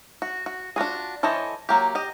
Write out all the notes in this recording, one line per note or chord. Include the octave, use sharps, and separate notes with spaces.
F#4
F#4
D4 F4 F#4 G#4
E3 A4 C5 C#5 D#5
F#3 A#3 G4
G4 D#5